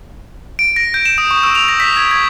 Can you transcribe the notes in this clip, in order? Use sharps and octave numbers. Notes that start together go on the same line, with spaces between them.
D7
A#6
G6
E7
D#6
C#6
E6
F7
A#6
B6
G#6
G#6